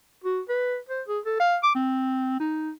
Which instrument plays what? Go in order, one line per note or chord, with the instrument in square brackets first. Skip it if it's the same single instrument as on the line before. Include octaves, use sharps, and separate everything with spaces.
[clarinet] F#4
B4
C5
G#4
A4
F5
D6
C4
D#4